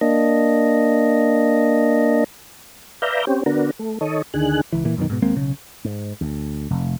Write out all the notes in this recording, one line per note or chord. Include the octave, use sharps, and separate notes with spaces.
A#3 D4 D#5
B4 D5 E5 F5 A#5 G6
C4 C#4 G4
D3 B3 D4 F#4 A#4
A3
D#3 A4 C#5 D#5
D2 D3 D#3 G#4 F#6
C#2 E3
A#2 E3
B1 F#2 B2 D#3
G#2 B2
D#2 G#3 A#3 C4
B1 C#3
G#2
D2
F1